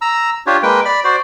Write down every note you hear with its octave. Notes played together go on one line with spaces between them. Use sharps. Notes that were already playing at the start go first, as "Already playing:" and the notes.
A#5 E6
D4 F4 G4 C#5
G#3 A#3 B4 G5
D5 B5
F#4 C5 D5